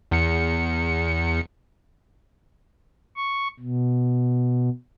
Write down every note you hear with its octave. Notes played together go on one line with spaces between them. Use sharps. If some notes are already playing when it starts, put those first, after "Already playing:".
E2 C#7
C#6
B2